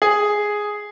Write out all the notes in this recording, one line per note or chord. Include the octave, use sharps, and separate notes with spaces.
G#4